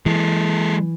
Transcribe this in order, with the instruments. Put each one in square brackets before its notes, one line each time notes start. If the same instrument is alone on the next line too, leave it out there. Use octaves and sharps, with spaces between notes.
[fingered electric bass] E3 [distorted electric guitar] G#3 A4